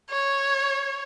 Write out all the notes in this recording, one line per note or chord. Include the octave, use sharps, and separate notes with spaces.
C#5